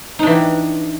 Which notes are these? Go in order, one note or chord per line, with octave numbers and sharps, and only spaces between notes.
E3 D4 D#4 G4